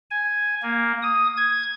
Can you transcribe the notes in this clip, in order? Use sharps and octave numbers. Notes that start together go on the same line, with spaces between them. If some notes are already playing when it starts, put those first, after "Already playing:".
G#5
A#3
D#6
G#6